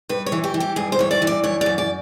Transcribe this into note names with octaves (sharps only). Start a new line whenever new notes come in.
G2 B4
C#5
E3
G4
E3
G4
G2 G#4
C5
E3 C#5
D5
E3
D5
F#2 C#5
F#2 D5
D5